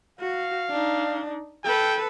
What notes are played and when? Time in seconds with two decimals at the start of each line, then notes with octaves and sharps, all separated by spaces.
0.20 F#4 F5
0.70 D4 D#4
1.64 A4 B4 G5